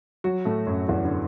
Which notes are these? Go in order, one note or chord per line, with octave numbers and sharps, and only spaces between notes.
F#3 F#4
A2 A3
F#2 F#3
E2 E3
D3